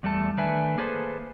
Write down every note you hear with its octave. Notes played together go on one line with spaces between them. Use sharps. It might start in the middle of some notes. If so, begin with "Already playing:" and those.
E2 G3 A3 A4 A5
D#3 A3 D4 B4 E5 G#5
A#3 G#4 A4 B4 C5